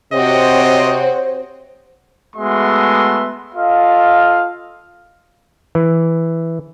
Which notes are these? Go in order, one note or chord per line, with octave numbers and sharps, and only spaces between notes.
C3 C4 F#4 C5 C#5 D#5
G#3 A3 B3 F#4 E5 C6
F4 A4 D#5 F5
E3